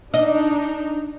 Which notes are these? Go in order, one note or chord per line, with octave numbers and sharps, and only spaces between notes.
D4 D#4 D#5